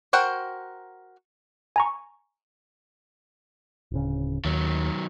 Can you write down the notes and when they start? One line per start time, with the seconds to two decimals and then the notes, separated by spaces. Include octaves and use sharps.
0.13 F#4 A#4 C5 F#5 G5
1.76 G#5 A#5 C#6
3.92 D1 C#3
4.45 D#2 D#3 F#3